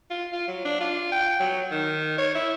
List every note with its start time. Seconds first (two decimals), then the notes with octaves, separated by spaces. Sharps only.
0.11 F4
0.32 F4
0.48 F#3
0.65 D4
0.80 F4
1.12 G5
1.40 F#3
1.71 D#3
2.18 C#5
2.35 E4